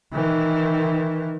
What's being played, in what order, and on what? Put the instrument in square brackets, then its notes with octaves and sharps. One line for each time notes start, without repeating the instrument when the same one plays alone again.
[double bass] D#3 E3